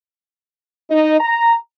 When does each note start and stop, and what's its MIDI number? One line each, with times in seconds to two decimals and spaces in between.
0.90 1.17 63
1.20 1.54 82